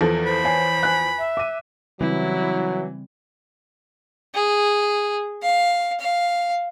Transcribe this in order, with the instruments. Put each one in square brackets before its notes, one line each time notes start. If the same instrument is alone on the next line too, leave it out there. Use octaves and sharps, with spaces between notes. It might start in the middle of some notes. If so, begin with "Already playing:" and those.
[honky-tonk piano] E2 F3 [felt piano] A4
[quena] C5 [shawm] B5
[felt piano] C#5 G#5 C7
G#5 F#6
[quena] E5
[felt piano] D6 D#7
[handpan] C#3 G3 C4 [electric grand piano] E3 [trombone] F#3 [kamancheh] E4
[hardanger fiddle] G#4
F5
F5